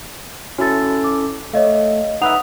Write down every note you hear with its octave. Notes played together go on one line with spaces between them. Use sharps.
C#4 E4 F#4 A4 A6
D6
A3 C#5 D#5 F5
D#4 B4 E5 F#5 D#6 F7